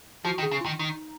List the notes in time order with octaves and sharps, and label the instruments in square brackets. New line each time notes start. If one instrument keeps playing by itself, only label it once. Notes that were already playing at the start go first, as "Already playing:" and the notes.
[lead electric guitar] F3 [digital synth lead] F#4
[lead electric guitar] D#3
[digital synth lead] G#4
[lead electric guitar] C#3
[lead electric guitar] D#3 [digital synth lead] F4
[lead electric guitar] D#3 [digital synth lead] D#4